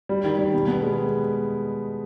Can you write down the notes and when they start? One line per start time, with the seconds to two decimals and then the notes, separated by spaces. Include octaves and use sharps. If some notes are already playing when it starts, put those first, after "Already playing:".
0.09 G3
0.24 D#3
0.39 G3
0.54 B2
0.68 B3
0.82 G#3